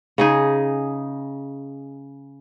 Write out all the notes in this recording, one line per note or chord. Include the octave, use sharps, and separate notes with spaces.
C#3 D#4 G#4